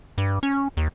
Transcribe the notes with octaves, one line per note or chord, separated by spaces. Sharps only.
G2
C#4
D#2